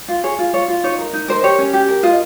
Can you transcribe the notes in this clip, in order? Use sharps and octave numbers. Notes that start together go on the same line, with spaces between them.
F4
G#4 C#5
F4
F4 C#5
F4
D#4 C#5
A#4
D#4
A#4 C5
G4 C#5
C#4
G4
A#4
F4 D#5